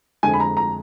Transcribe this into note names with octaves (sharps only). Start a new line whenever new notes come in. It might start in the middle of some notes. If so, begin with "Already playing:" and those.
F2 D3 G#3 G#5
B5
A#5
A#5